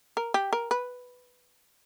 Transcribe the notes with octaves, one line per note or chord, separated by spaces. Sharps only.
A#4
G4
A#4
B4